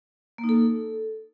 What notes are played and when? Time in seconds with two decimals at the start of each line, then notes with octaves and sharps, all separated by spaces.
0.38 A#3
0.44 D#4
0.49 A4